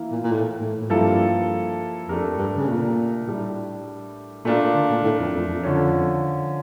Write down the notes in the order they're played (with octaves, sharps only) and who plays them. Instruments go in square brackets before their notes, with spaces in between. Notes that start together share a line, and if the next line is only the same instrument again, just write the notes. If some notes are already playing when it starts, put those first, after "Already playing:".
Already playing: [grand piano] E3 A#3 E4
[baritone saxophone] A#2
A#2
A2
A2
A2
[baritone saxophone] G2 [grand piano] F3 A#3 E4 A4
[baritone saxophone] F2 [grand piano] A3 D4 G4 A#4
[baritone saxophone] G2
C#3
A#2
[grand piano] A2 G3 D4
[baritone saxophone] A#2 [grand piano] A3 D4 F4 A#4
[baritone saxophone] D3
A#2
A2
F2
F2
F2
[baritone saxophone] F2 [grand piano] D3 F3 C#4